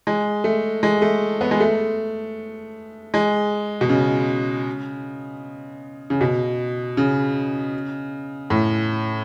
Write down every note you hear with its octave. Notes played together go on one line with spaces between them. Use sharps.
G#3
A3
G#3
A3
B3
G#3
A3
G#3
B2
C#3
C#3
B2
C#3
A2